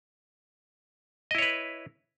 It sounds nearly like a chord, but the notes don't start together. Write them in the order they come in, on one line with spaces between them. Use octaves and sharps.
D#5 E4 C#5 B4